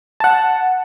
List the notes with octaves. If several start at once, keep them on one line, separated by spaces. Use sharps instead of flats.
F#5 A5